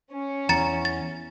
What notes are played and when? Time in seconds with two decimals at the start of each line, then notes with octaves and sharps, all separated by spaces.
0.12 C#4
0.49 E2 A#5 A6 C#7
0.85 A6